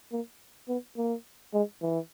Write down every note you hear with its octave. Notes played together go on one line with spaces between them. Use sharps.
A#3
B3
A#3
G#3
E3